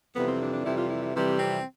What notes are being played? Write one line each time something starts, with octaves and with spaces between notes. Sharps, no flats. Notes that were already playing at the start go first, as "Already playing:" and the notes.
F2 C3 E3 G3 B3
C4
D4
D4
F2 C3 E3 G3 E4
F4
E4
E4
F2 C3 E3 G3
C4